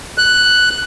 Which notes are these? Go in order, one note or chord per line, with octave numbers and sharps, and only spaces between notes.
F#6